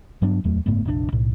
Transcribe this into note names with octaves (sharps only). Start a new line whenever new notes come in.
G2 F#3 B3 D4
D1 E2 F#3 A3
F#1 G#2 A3 B3
F1 A#1 A2 D4
B1 A2